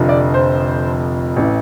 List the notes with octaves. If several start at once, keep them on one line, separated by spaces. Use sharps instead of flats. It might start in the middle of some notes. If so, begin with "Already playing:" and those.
Already playing: F1 F2 D3 F3
D5
C5
A1 A2 E3